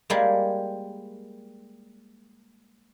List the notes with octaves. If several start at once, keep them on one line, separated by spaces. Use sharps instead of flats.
G3 G#3 A#3